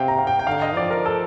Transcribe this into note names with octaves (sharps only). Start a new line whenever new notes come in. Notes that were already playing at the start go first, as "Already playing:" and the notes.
Already playing: C3 F5 G5
A#5
F5
G5
G5
D3 F5
D#5
F3 D5
A#4
A4